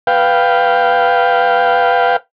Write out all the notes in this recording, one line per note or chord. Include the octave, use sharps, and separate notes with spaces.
B4 F5 G5